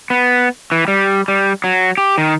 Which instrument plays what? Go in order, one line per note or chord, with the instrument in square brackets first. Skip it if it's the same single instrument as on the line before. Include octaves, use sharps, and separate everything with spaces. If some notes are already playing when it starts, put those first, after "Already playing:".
[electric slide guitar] B3
E3
G3
G3
F#3
G4
D#3